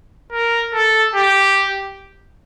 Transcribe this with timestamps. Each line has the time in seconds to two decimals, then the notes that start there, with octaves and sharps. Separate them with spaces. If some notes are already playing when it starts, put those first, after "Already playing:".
0.33 A#4
0.74 A4
1.15 G4